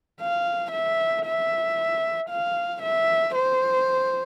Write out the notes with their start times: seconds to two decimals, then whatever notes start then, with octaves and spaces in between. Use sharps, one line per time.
0.21 F5
0.72 E5
1.26 E5
2.30 F5
2.83 E5
3.36 C5